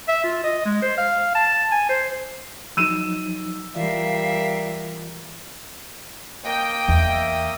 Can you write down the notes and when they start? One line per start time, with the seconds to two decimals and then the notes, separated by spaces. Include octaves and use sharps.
0.08 E5
0.23 F4
0.43 D#5
0.65 G#3
0.82 C5
0.97 F5
1.35 A5
1.71 G#5
1.89 C5
2.77 F3 F#3 D#4 E6 D#7 E7
3.75 E3 G3 F4 A#4 D5 E5 F5
6.45 A#3 D#5 G5 D#6
6.88 E2 E5